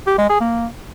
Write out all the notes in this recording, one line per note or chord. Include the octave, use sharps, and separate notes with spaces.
G4
G#3
G#4
A#3